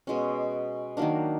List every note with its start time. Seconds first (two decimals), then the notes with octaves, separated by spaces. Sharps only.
0.07 B2 G#3 C#4
0.97 D#3 F#3 A#3 D4